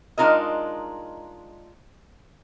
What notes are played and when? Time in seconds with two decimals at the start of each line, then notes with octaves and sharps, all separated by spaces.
0.18 G#3 D4 D#4 F4 A#4 D#5